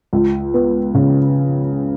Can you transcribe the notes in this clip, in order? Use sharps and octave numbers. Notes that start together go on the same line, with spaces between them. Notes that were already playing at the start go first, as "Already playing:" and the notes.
C#2
B3
C#3